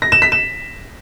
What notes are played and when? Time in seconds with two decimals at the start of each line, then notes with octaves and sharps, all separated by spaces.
0.02 A#6
0.12 E7
0.22 B6
0.32 E7